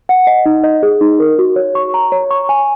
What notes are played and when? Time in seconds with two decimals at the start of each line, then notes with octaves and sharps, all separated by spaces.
0.09 F#5
0.27 D#5
0.46 D#4
0.64 D#5
0.83 G#4
1.01 D#4
1.19 A#4
1.39 F#4
1.56 C#5
1.75 C#6
1.94 A#5
2.12 C#5
2.31 C#6
2.49 G#5